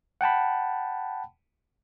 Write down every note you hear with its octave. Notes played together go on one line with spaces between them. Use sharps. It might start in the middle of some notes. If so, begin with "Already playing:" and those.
F#5 G5 A5 B5